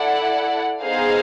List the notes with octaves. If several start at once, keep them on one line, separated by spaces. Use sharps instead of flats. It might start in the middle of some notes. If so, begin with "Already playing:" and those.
Already playing: E4 A4 D5 F#5
B3 D#4 G#4 C5 F5